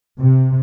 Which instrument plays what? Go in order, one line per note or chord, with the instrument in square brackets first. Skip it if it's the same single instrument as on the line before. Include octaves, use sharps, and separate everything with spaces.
[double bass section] C3